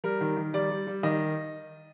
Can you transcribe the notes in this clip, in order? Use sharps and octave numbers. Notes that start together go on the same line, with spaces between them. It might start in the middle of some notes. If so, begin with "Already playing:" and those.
G3 A#4
D#3
D#3
G3 D5
G3
G3
D#3 D#5